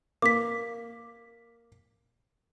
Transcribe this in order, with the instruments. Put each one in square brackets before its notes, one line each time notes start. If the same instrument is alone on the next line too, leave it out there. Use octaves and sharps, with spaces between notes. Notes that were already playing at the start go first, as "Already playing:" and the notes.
[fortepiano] A#3 [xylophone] D6 B6